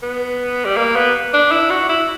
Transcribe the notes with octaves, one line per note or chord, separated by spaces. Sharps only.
B3
G3
A#3
B3
D4
E4
F#4
E4